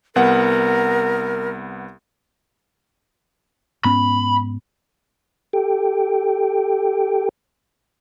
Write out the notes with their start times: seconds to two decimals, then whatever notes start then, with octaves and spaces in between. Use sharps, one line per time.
0.16 C2 B3 A#4 F#5
3.84 G#2 B3 C#4 B5
5.53 G4 A4 G5